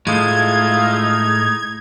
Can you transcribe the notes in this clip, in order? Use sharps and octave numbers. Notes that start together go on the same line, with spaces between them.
A2 F3 G#3 D#4 E5 F5 G#6